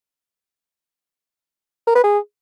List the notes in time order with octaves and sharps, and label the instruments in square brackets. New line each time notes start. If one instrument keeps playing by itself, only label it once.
[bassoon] A#4
B4
G#4